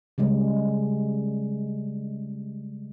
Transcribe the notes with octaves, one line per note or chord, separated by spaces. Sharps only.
C#3 G3 G#3